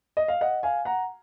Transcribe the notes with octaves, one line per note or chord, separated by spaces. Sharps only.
D#5
F5
D#5 F#5
F5 G#5
F#5 A#5